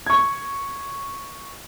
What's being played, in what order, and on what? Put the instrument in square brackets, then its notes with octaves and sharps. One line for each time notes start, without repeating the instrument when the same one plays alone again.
[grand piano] C#6 G#6